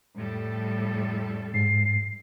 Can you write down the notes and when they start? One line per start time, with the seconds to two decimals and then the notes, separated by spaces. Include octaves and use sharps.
0.16 F2 A2 G3 A4
1.54 G#2 C7